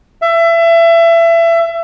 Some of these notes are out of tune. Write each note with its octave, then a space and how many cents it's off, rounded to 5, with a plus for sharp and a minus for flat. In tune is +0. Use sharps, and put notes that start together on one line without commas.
E5 +25